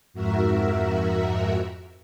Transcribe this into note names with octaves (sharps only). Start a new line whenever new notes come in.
F2 G#2 F#4 A#4 E5